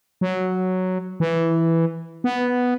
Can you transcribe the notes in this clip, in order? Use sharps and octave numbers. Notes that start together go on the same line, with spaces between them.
F#3
E3
B3